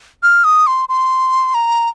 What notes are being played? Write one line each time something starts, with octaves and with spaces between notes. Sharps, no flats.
F6
D#6
C6
C6
A#5